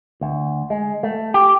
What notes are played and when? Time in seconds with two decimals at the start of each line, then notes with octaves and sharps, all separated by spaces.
0.21 D2
0.70 G#3
1.03 A3
1.34 G4